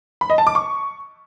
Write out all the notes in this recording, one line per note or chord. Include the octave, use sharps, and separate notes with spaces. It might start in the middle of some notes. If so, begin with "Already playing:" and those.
B5
D#5
A5
D6
C#6